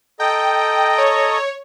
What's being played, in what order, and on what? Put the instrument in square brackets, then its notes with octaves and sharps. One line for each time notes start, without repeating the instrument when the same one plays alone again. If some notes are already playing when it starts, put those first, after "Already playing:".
[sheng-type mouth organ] A4 D#5 A#5 [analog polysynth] G5
[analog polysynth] C#5